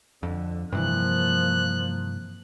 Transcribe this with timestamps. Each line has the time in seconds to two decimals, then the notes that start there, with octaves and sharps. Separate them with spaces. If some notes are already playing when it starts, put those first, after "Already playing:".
0.23 F2 D3
0.72 G2 C3 E3 F3 A#3 F#6